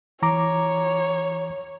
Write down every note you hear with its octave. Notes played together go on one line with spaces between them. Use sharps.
E3 C#5 A#5 D6